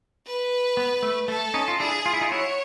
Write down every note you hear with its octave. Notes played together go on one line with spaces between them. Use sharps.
B4
B3
A3
A3 A4
C#4 D#4
F4
D4 E4 G#4
F4
E4
D#4 F4
E4 F#4 C#5